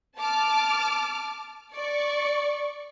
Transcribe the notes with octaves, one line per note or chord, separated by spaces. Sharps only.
A5 D6 F6
D5 C#6